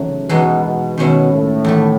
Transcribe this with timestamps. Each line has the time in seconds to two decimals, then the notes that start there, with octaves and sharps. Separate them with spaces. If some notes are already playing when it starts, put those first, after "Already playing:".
Already playing: E2 C#3 F#3 A3 D#4
0.29 B2 E3 G#3 D#4 F#4
0.64 B2
0.98 B2 D#3 G#3 C#4 E4
1.32 A2
1.65 E2 D#3 A3